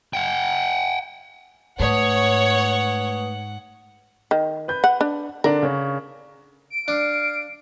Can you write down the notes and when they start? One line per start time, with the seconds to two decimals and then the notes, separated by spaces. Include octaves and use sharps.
0.13 F#5 G5
1.80 G#2 A3 B4 C#5 F#5 D#6
4.31 D#3
4.68 B4 G6
4.84 F#5
5.01 D4
5.44 D3 D4 A#4
5.63 C#3 C#4
6.70 D7
6.88 D4 F5